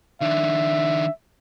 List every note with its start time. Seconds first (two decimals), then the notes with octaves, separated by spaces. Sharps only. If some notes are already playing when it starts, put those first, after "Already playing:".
0.21 D#3 D4 E5